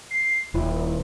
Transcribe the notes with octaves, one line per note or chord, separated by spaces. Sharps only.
C7
D#1 E4